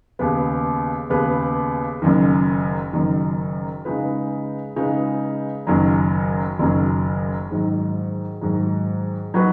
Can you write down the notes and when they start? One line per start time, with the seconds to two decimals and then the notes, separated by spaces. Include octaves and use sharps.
0.19 D#2 C#3 B3 G#4 B4
1.10 D#2 C#3 B3 G#4 B4
2.02 F#1 F#2 D#3
2.93 F#1 F#2 D#3
3.85 C#3 G#3 D#4 B4
4.76 C#3 G#3 D#4 B4
5.67 F#1 F#2 D#3 F#3
6.59 F#1 F#2 D#3 F#3
7.51 G#2 D#3 F#3
8.41 G#2 D#3 F#3
9.34 F#3 D#4 F#4 B4